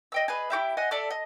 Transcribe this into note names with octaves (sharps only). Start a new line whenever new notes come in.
D#5 G5 E6
G#4 B4 D#5
E4 F#4 G4 E5
D#5 F#5 G#5
A4 D5 E5 A5
D#5